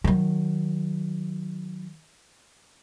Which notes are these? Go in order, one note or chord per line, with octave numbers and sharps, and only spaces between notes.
D#3 F#3